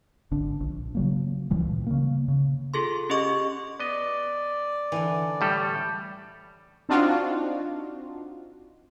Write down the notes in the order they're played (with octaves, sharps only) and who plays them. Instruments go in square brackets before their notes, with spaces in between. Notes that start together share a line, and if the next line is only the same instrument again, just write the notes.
[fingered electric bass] G#1 D3 D4
A#1
C#3 F#3 A#3
C#2 A#2 E3 G3
C#3 A#3
C#3
[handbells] F4 G#4 A4 C6
C#4 G4 G#4 D#5 C#6 D6
[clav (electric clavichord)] B3 D#5 [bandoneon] D5
[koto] D3 E3
[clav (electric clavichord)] A2 G3 A4
[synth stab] C4 D4 D#4 F4 F#4